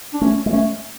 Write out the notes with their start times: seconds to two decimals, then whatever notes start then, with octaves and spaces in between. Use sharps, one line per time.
0.14 D4
0.21 A3 C#4
0.46 G#3
0.53 A3 C#4